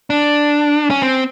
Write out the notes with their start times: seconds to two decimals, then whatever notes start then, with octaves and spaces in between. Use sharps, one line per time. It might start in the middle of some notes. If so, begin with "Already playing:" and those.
0.10 D4
0.90 C#4
1.02 C4